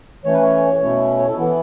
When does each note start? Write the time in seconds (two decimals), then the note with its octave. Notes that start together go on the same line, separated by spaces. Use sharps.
0.24 E3 A3 C#4 C#5
0.33 B4
0.42 C#5
0.81 B2 A3 C#4 E4
1.18 C#5
1.27 A4
1.36 E3 B3 E4